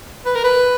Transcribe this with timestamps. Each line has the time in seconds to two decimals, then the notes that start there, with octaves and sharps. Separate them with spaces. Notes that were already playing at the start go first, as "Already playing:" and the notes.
0.26 B4
0.36 A#4
0.44 B4